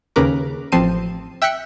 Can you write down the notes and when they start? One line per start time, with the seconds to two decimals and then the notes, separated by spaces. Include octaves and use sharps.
0.16 D#2 C#3 A#4 B4 D6
0.72 A1 F3 C4 A5 C7 D#7
1.42 E5 G5 E6 F#6 B6 C#7